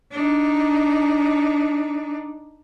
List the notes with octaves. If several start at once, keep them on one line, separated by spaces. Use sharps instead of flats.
D4 D#4